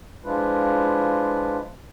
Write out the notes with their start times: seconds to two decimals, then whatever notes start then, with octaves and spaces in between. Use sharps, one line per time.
0.24 F3 G#3 D4 E4 F4 B4